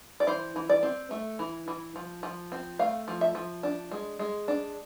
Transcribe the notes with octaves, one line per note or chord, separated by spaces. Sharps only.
D5
E3 C5
E3
D5
C4
A3
E3
E3
F3
F3
C4
A3 F5
F3
E5
F3
D4
G#3
G#3
D4